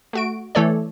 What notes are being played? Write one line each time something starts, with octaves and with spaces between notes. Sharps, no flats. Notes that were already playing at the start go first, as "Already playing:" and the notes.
A3 F#4 D7
E3 A3 A4 C#5 D5